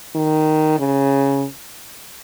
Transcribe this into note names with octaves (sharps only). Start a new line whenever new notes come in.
D#3
C#3